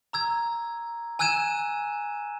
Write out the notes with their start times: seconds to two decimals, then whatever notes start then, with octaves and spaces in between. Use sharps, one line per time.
0.13 A#5 E6 G#6
1.19 G#5 E6 F#6 G#6 D#7 E7